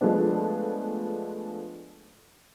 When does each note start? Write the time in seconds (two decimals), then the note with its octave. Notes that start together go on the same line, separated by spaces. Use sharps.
0.01 F3 G#3 A3 B3 D4